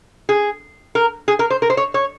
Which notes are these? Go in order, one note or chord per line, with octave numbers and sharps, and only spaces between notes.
G#4
A#4
G#4
A#4
C5
A#4
C5
C#5
C#5